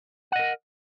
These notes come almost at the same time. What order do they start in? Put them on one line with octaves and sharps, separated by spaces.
F#5 D#5 A#4